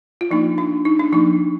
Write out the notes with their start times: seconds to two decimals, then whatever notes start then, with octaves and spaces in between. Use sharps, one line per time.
0.21 F4
0.31 F3 A#3 D4 D#4
0.58 D4
0.85 D#4
0.99 D4
1.12 F3 A#3 D4 D#4